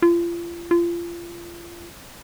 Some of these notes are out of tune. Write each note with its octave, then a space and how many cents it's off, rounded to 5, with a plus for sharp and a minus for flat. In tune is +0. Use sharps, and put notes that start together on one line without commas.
F4 -35
F4 -30